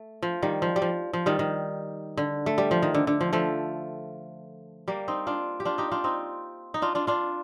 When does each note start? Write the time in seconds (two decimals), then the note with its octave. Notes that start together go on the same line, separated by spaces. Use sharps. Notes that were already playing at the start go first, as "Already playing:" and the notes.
Already playing: A3
0.23 F3
0.42 D#3 G3
0.62 F3
0.76 G3
0.82 F3
1.13 F3
1.26 D#3 G3
1.39 D#3
2.18 D3
2.46 A3
2.58 G3
2.71 F3
2.82 D#3
2.94 D3
3.07 D3
3.21 F3
3.33 F3 A3
4.88 G3 A#3
5.08 C4 D#4
5.27 D4 F4
5.60 G4
5.65 D4 F4
5.78 D#4 G4
5.91 D4 F4
6.04 C4 D#4
6.74 D#4
6.82 D4 F4
6.95 D4 F4
7.07 D4 F4